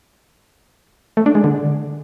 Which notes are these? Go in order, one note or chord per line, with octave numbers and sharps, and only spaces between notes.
A3
D4
G#3
D3